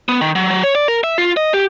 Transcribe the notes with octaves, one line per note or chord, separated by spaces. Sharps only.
B3
D#3
F#3
F#3
C#5
D5
A#4
E5
F4
D#5
G4